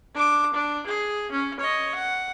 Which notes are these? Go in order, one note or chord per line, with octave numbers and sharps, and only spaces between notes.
D4 D6
D4
G#4
C#4
C#5 D#5
F#5